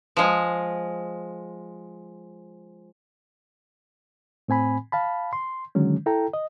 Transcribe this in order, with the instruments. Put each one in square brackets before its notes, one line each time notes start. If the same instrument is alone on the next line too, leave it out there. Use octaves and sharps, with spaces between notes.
[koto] F3 G#3
[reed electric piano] A2 C4 G#5 B5
F5 A5 B5
C6
D3 D#3 F#3 G#3 C#4
E4 A4 G5 A#5
D#5